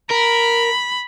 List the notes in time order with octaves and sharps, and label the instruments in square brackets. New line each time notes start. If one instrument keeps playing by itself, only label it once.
[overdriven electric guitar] A#4 [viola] B5